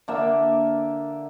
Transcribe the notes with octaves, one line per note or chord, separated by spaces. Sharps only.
D3 A#3 E5